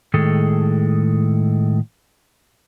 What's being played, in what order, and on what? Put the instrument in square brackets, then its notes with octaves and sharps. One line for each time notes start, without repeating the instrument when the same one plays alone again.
[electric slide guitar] A2 D#3 G#3 G#4 A4